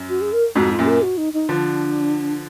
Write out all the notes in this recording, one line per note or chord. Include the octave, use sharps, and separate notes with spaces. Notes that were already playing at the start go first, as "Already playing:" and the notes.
Already playing: F#2
F#4
G#4
A#4
F2 G#2 F#4
F4
F#2 A#2
A#4
F#4
D#4
D#4
D3 F3 D4